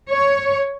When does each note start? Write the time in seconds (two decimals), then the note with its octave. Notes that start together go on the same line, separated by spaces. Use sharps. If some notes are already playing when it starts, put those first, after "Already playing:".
0.11 C#5